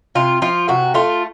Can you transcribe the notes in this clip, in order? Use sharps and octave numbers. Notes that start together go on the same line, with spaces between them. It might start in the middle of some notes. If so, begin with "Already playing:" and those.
C3 F4
F3 F4
C3 F#4
A3 F4